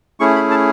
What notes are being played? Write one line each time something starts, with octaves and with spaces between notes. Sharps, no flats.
A3 C#4 E4 G#4 C#6
B5
A5